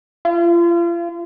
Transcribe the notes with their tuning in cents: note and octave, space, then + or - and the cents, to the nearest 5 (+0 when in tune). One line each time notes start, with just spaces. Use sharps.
F4 -35